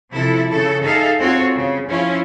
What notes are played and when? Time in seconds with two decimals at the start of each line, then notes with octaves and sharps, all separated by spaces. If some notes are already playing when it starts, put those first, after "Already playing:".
0.12 C3 F3 E4 A4
0.49 C#3 A4
0.84 D#4 G#4 A4 E5 F5
1.19 C4 F4 F#4 A4 C#5
1.54 C#3
1.90 F3 C#4 E4 F4